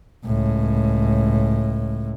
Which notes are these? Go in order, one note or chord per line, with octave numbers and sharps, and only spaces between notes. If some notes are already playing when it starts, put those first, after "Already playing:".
C#2 A2